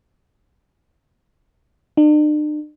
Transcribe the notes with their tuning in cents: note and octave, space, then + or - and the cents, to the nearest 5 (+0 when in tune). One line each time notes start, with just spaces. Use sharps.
D4 +45